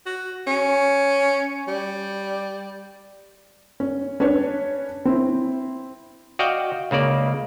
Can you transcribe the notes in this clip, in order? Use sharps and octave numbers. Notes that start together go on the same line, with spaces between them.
F#4
C#4
G3
C#4
C#4 D4 B4 C#5
C4 E4
F#4 D5 D#5 F5 G5
C#2 C#3 A#3 D5